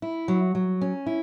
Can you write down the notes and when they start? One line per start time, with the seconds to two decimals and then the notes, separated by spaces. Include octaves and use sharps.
0.02 E4
0.28 F#3
0.55 F#3
0.81 C#4
1.06 E4